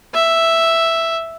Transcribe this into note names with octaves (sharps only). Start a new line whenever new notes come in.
E5